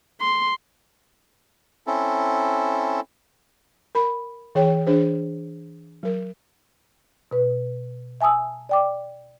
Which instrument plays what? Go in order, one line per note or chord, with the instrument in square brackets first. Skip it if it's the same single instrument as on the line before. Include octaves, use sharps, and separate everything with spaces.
[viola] C6
[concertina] C4 C#4 E4 A4
[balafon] A#4 B5
E3 G#4 C#5 G5
E3 D4 G#4 C5
F#3 A#4
[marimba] B2 B4
E5 G#5 A5 D#6 E6
D5 G5 D6